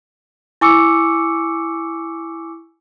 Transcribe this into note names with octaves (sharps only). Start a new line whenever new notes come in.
E4 G#5 C#6 D6 E6 C#7